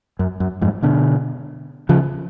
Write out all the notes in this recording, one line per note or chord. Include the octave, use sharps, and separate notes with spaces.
F#2
F#2
F2 G#2
B2 D3
C#3 F3